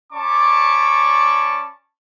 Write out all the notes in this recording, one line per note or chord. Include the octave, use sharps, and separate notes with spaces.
C#4 D5 A5 B5 C#6 D6